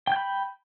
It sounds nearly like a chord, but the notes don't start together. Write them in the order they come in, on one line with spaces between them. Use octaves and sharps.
G5 G6 B5